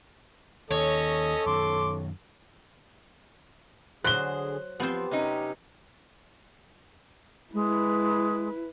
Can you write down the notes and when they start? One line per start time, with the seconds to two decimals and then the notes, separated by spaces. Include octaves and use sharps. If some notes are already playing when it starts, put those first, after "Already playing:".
0.71 D#2 D#3 C#4 A4 C#5 D#5
1.46 F#2 D#3 C6 D6
4.04 D3 F#3 G#4 C5 F#6 G7
4.80 F3 B3 C4 G4 C5
5.11 C3 C#4 D#4
7.54 G#3 E4 B4